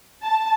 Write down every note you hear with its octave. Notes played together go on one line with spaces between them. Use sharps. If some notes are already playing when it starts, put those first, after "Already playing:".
A5